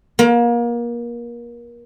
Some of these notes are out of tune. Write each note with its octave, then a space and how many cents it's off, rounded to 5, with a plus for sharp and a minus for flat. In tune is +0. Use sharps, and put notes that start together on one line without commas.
A#3 +30